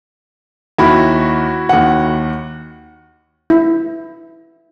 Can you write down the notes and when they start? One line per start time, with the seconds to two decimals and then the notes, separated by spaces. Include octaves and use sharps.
0.78 D#2 E4 F#4 B5
1.69 D#2 F#5
3.50 E4